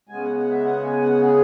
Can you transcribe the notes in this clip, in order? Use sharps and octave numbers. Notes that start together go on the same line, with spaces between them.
C#3 G#3 B3 G#5
F#5
F#5
E5
F#5
G#5
F#5
G#4